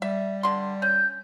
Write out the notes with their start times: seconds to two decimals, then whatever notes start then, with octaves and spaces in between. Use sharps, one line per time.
0.02 G3 E5
0.43 D3 C6
0.82 C#4 G6